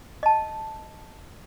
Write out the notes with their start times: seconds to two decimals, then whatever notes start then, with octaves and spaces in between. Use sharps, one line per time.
0.23 D#5 A5